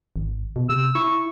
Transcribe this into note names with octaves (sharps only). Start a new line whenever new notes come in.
G#1
B2
C3 E6
E4 C#6